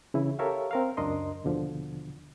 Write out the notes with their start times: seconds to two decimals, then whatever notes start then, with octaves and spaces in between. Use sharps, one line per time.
0.14 C#3 E3 E4
0.39 G4 A4 A#4 C#5 E5 F5
0.71 C4 A#4 F5
0.97 C#2 F#2 D4 A#4 D#5 C6
1.44 D#2 B2 D3 F3